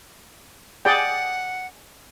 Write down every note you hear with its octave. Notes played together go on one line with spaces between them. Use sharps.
G#4 D5 F#5 G5